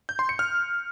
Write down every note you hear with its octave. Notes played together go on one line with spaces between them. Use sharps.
G6
C6
C#7
F6